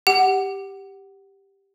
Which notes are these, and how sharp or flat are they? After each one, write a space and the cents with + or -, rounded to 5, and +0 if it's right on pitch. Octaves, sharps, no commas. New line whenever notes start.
G4 +0 F#5 +15